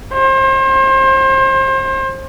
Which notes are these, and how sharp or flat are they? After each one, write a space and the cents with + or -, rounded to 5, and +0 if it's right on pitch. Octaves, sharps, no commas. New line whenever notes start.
C5 +35